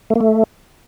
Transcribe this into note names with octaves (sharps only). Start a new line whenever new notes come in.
A3
A#3
A3